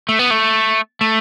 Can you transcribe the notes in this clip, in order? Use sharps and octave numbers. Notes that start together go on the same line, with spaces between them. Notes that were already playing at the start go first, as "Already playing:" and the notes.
A3
B3
A3
A3